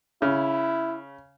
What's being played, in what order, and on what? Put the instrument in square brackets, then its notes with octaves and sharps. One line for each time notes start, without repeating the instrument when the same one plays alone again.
[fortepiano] C#3 [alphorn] E4